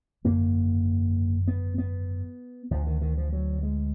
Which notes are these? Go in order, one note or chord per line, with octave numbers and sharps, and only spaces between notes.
G#1 F#2 D3 A#3
B3
B3
D2 D3 F3
D#3
D#3
F3
F#3
G#3